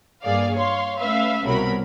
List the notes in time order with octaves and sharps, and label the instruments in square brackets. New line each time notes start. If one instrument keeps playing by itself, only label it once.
[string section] G2 A#3 G#4 D5 F5
C#5 F5 C6
A3 C#4 B4 E5 F5
C2 B2 F#3 A#4 B5